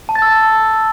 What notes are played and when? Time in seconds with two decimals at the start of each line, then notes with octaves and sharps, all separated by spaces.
0.09 A5
0.15 A6
0.22 E6